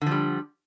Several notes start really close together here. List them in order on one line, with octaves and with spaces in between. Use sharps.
D3 F3 G3